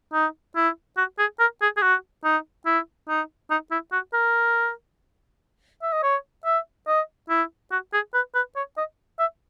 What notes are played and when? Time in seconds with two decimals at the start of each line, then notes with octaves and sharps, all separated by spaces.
0.13 D#4
0.56 E4
0.97 F#4
1.19 G#4
1.40 A#4
1.61 G#4
1.77 G#4
1.82 F#4
2.24 D#4
2.66 E4
3.08 D#4
3.50 D#4
3.71 E4
3.92 F#4
4.13 A#4
5.82 E5
5.92 D#5
6.03 C#5
6.45 E5
6.87 D#5
7.29 E4
7.71 F#4
7.93 G#4
8.14 B4
8.34 B4
8.56 C#5
8.77 D#5
9.19 E5